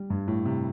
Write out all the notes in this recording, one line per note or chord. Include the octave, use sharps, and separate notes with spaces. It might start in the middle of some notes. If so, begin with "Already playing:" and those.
Already playing: G3
G2
A2
C3